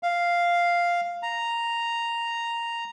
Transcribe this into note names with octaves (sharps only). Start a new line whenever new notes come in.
F5
A#5